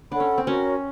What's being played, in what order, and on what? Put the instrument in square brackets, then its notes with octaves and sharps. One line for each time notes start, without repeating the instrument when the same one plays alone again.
[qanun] D4 [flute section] A4 C#5 F#5 B5
[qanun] C#4
C4
[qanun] C#4 [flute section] F#4 A#4 C#5